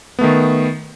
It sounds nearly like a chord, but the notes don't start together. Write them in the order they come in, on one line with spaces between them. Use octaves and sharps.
B3 A3 D#3